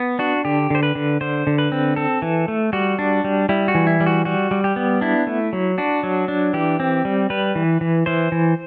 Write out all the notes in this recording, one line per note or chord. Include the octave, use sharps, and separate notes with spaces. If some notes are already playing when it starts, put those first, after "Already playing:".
Already playing: B3
D4 F#4
D3 G4
D3 C5
B4
D3
D3 C5
D3
B4
C4
C4 A4
E3
A3
G3 F#4
D4
G3
G3 E4
F#4
E3
E4
G3
F#4
G3 F#4
G3
G4
B3
D4 E4
A3
F#3
D4 F#4
F#3
D4
E3 G4
C4
G3
G3 B4
E3
E3
E3 C5
E3